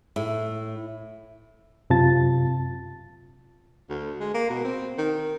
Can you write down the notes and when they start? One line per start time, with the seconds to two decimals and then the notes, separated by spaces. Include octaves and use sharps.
0.16 A2
1.90 F#2 C3 F4 A5 A6
3.89 D2
4.20 G#3
4.34 A#3
4.50 B2
4.65 C4
4.98 D#3